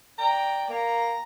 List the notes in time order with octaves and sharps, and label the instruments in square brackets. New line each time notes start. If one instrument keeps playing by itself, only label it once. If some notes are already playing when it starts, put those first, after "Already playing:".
[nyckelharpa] D5 G5 [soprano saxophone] A#5
[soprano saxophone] A#3 [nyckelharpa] A#5